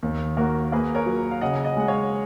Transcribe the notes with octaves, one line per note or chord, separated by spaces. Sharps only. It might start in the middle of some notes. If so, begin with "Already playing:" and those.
D#2
A#3 F#4 A#4
A#3 G#4 B4
A#4 C#5
F#3
F5
C#3 D#5 F#5
G#5
D#5 F#5
G#3 F#5
C#5 F5